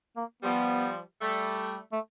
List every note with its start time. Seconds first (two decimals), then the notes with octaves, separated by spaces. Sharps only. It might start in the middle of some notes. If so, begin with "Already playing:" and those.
0.16 A#3
0.42 F3 G3 B3
1.21 G3 A3
1.92 A3